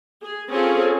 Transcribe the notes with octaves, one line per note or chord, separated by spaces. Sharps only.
G#4
C4 C#4 F4 G#4 A4